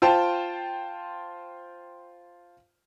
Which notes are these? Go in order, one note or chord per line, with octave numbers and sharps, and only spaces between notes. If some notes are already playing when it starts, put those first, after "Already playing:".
F4 C5 G5 A5